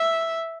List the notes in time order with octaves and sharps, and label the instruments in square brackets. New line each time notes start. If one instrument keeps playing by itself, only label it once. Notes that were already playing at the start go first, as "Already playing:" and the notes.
Already playing: [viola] E5